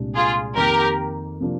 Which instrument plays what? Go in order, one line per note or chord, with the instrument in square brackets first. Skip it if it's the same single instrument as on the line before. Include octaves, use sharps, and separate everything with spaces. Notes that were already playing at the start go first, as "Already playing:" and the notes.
Already playing: [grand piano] C2 A#2 G#3 D4 G4
[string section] F4 G#4
[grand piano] F2 D#3 A#3 [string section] G4 A#4
[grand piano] C3 F3 A#3 D4